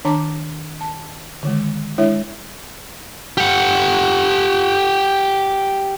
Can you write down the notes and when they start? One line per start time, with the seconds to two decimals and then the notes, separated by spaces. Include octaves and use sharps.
0.05 D#3 D4 A5 A#5 D6
0.81 A5
1.43 D3 D#3 G#3
1.98 G#3 D4 E4 C#5 E5
3.38 G4 F#5